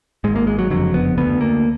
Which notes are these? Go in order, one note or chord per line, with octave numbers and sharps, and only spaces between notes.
G#1 G#2 G#3
A#3
G#3
F#3
F#1 F2 D3 F#3
B3
D2 D3 B3
A#3